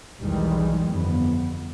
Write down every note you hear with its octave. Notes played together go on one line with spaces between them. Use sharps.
B1 E2 D#3 E3 G3 G#3
G1 F2 B3